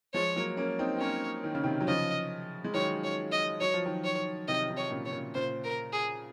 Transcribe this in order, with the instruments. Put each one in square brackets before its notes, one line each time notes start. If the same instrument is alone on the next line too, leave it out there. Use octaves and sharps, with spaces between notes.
[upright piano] F3 G#3 [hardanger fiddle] C#5
[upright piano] F#3 A#3
A#3 C#4
C4 D#4
C4
[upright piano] A#3 C#4 [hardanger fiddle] C#5
[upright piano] D#3
C#3
C3 D#3
F#3
[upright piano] C#3 F3 [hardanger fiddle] D#5
[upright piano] G#3
[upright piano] D#3 F#3 [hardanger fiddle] C#5
[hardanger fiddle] C#5
D#5
[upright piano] F#3 [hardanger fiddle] C#5
[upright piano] F3
D#3 F#3
[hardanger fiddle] C#5
[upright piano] C3 D#3 [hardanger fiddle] D#5
[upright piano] C3 D#3
[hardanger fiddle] C#5
[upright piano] A#2 C#3
[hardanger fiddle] C#5
[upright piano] A#2 C#3
[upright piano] A#2 C#3 [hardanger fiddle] C5
[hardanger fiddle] A#4
G#4